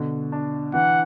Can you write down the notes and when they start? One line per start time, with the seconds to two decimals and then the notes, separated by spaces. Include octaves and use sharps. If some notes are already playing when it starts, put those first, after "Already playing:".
Already playing: B2 D3
0.32 D4
0.74 E3 F#5